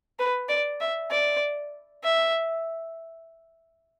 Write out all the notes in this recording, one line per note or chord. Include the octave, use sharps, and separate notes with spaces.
B4
D5
E5
D5
E5